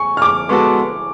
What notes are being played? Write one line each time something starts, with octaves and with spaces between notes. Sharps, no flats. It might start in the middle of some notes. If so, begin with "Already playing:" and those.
Already playing: G#5 C#6
F6
D6
G#3 B3 F#4 A4 C#6